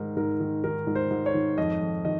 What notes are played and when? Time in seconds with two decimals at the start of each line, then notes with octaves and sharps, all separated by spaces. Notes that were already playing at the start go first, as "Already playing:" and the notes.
Already playing: G#2 D#3 A#4
0.17 G#2 A#4
0.40 D#3
0.64 D#3 A#4
0.87 G#2
0.95 C5
1.11 G#2
1.26 C#5
1.34 D#3
1.58 F2 D#5
1.81 F2
2.05 D#3 D#5